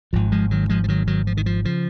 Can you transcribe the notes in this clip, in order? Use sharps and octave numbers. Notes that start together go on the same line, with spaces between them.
G#1 G#2 F3
F3 G#3
D#3 F#3
F3 G#3
F3
D#3 F#3
D#3 F#3
F3
D#3
F3
C#3 F3